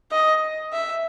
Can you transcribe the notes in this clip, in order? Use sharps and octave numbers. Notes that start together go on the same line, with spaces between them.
D#5
E5